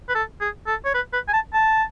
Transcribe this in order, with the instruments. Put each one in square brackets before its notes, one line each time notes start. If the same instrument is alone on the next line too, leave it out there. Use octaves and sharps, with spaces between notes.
[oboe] B4
A4
G#4
A4
C#5
B4
B4
G#5
A5
A5